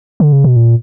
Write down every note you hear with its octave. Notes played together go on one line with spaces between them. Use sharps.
D3
C#3
B2
A#2